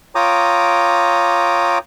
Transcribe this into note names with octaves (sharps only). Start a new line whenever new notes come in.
F4 C#5 G5 A#5 D6 D#6